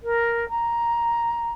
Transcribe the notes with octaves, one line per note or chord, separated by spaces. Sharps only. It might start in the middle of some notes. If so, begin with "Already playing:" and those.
A#4
A#5